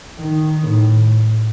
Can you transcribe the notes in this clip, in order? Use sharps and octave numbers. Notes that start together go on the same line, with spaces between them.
D#3
A2